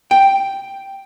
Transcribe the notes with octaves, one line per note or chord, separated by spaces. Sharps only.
G5